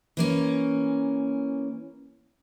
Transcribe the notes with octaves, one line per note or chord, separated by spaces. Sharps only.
E3 A#3 C#4